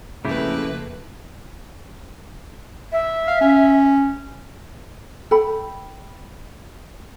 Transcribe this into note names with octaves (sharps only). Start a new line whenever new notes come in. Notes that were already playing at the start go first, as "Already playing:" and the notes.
F2 C#3 A3 A#3 E4 G4 B4
E5
F5
C#4
A4 G5 B5